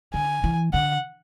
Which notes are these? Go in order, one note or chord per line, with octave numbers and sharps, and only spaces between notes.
D3 G#5
E3
D3 F#5